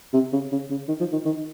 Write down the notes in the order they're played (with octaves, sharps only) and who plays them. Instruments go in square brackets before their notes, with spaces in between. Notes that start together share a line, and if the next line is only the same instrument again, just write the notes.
[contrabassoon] C3
C#3
C#3
C#3
D#3
F3
D#3
D#3